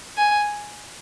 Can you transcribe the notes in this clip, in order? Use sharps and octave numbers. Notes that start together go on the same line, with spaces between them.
G#5